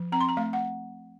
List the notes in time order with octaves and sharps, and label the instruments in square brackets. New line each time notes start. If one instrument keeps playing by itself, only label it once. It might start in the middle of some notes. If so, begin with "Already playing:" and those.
Already playing: [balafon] F3
C4 A#5
C6
A#5
A3 F5
F#5